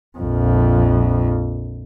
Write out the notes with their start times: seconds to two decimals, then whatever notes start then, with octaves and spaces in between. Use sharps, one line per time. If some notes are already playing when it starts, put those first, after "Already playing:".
0.18 A#1 F2